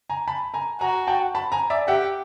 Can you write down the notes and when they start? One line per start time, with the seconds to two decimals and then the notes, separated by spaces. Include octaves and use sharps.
0.10 G#5 A#5
0.27 A5 B5
0.54 G#5 A#5
0.81 F#4 G#5 A#5
1.07 G5 A5
1.35 A5 B5
1.52 G#5 A#5
1.70 D5 E5
1.88 G4 E5 F#5